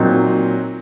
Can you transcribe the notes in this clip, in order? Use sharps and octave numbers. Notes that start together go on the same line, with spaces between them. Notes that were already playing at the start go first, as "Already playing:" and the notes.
Already playing: A#2 F#3 C4 D#4